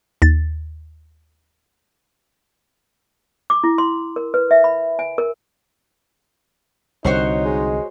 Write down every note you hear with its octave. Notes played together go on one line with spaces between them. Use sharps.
D#2 A6
D6
E4
C6
A#4
B4
E5
B5
G#5
A#4
C2 D3 D#4 F#4 C5 C#5
G#3